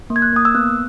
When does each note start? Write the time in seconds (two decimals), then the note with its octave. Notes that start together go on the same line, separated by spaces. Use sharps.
0.10 A#3
0.16 G#6
0.22 F#6
0.33 A#3 D#6
0.45 E6
0.55 B3 F#6